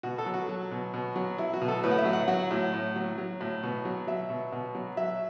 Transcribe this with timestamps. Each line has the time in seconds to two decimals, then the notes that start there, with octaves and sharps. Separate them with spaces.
0.03 B2 F#4
0.18 A4
0.26 F#3
0.34 F#4
0.49 F#3
0.71 B2
0.93 B2
1.16 F#3
1.38 F#3 E4
1.54 F#4
1.61 B2
1.68 A4
1.83 A2 B4
1.91 F#5
1.98 E5
2.05 F#3
2.13 F#5
2.28 F#3 F#5
2.51 A2
2.73 A2
2.96 F#3
3.18 F#3
3.41 A2
3.63 B2
3.85 F#3
4.07 F#3 E5
4.30 B2
4.52 B2
4.75 F#3
4.97 F#3 E5